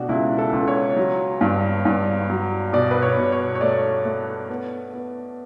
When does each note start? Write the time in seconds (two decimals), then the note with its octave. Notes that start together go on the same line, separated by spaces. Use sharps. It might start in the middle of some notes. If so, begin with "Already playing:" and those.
Already playing: B2 A3 D4 F#4 G4
0.09 C#2 E4
0.38 A4
0.53 C#2
0.68 C#5
0.96 F#3
1.41 G2
1.85 G2
2.30 F#3
2.73 B2 D5
2.91 B4
3.02 C#5
3.17 B2
3.32 C#5
3.55 C#5
3.61 A3 D5
4.05 A3
4.49 B3
4.93 B3